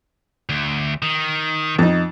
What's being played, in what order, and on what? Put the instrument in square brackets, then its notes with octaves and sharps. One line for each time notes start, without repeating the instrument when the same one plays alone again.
[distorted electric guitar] D2
D#3
[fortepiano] F2 D#4